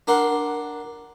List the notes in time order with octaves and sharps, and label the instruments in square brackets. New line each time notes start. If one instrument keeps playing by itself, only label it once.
[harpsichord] D4 A#4 F#5 C6